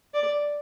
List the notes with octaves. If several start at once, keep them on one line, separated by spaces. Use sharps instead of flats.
D5